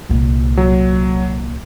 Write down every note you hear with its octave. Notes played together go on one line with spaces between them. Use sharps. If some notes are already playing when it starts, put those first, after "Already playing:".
C2 A#2
F#3